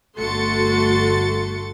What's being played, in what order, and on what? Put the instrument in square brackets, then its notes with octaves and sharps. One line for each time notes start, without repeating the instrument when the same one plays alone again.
[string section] G1 A3 F#4 C6 A6 C#7